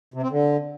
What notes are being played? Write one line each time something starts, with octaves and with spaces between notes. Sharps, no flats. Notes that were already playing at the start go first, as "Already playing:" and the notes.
C3
C4
D3